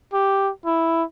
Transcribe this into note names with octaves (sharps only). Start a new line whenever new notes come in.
G4
E4